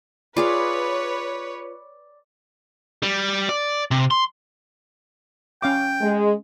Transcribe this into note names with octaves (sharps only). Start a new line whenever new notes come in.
F4 G#4 B4 C#5 D5 F5
G3
D5
C3
C6
C#4 F5 G5 D6
G#3